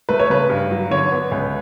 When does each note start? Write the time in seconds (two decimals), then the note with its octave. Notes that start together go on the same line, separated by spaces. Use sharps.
0.09 A3 B4
0.19 C#5
0.30 C#3 B4
0.49 G2
0.71 F#3
0.91 D3 C#5
1.12 B3
1.32 C#2